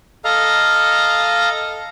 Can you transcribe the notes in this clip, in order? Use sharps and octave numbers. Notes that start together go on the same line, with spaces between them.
A4 D#5 F5 A#5